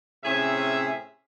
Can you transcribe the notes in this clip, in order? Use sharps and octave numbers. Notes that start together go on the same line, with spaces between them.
A2 C3 C#4 G#4 E5